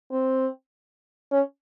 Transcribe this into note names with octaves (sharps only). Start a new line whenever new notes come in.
C4
C#4